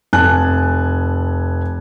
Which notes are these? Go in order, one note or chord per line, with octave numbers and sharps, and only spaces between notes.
F1 G#5 A5 F#6